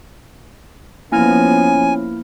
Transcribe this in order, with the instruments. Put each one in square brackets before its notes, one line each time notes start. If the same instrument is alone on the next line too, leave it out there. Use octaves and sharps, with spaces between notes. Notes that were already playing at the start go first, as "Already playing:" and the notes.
[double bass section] F3 B3 [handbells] A#3 E4 F6 [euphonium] C#4 [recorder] G#5